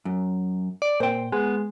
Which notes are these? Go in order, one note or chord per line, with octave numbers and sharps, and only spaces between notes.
F#2
D5
A#2 C5 G5
G#3 B3